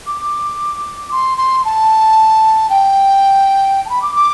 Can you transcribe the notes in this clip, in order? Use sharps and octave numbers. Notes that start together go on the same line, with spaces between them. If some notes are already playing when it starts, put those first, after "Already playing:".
D6
C6
C6
A5
G5
A5
B5
D6
D6